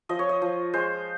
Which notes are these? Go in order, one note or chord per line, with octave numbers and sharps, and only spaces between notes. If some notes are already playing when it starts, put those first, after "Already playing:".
F3 D#5
C#5
D#5
F3
G#3 C5